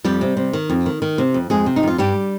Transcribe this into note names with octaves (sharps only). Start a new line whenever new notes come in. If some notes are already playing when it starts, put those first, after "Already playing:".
F2 G3 G4
C3
C3
D#3
F2
D#3
D#3
C3
F2
F2 G#3 G#4
C3
D#4
F2 F4
G2 G3 G4